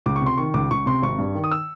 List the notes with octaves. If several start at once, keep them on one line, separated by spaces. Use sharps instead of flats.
C#2 D6
C#6
C3
C6
D#3 C#6
C#2 D6
C#2 C#6
C3 C6
G#1 C#6
G2
D#3
D#6
E6